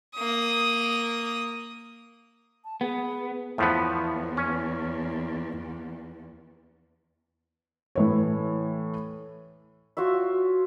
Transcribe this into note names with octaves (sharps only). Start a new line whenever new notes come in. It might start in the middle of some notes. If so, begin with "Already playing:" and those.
A#3 D#6
A5
B3 G#4
E2 A2 F3 B3
C#4
A2 E3 C#5
F4 F#4 C#5 E5